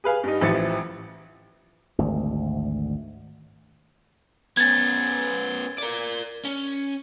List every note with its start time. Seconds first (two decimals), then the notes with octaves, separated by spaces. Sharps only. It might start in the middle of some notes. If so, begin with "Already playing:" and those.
0.04 G#4 B4 F5 G#5
0.24 G2 D#4
0.41 A1 E3 F3 A6 C#7
1.98 G#1 D2
4.57 B3 C#4 G#6 A6
5.78 A#4 D5
6.45 C#4